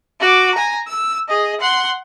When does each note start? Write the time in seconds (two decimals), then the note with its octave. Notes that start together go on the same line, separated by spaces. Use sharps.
0.21 F#4 D6
0.55 G#5 A#5
0.87 E6
1.29 G#4 D#5
1.61 F#5 C6